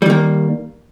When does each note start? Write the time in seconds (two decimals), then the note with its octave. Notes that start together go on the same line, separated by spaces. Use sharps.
0.02 G3
0.06 D#3
0.10 A#3